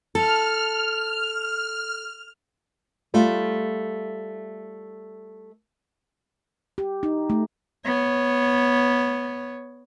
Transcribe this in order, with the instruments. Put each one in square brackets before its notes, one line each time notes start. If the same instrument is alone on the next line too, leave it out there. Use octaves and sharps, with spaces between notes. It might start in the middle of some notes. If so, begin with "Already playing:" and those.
[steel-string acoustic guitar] A4 [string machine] F6
[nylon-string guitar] G3 A3 F4
[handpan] G4
D#4
A3
[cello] B3 C#5